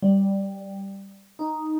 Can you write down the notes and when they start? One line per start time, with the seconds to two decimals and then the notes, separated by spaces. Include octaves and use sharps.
0.02 G3
1.39 D#4